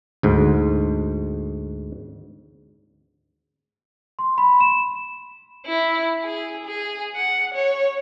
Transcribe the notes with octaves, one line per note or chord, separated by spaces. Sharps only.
D2 G#2
C6
B5
E7
E4
G#4
G#4
F#5
C#5